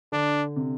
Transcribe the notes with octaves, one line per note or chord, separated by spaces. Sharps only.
D3 D4
C3